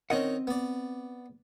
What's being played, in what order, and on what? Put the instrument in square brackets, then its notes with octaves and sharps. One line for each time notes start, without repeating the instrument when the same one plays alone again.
[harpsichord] D#3 C#4 [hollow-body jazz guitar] C4 D#5 F#5
[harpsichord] B3 D5